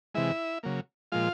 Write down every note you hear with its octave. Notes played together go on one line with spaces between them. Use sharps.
C3 E3 G#3 E4 E5
C#3 F#3 A#3
A#2 F3 G#3 F4 F5